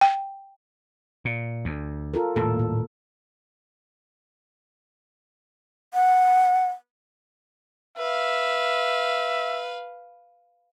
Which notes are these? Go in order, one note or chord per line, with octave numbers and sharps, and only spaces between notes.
G5
A#2
D2
F4 A4 A#4
D#1 A2 A#3 A4
A#2
F#5
B4 E5 F5